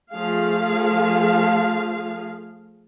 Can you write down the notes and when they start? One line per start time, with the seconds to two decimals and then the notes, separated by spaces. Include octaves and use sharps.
0.13 F3 A3 G#4 F5